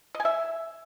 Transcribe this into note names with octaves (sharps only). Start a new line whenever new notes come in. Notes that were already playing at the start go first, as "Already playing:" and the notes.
D#5
G#5
E5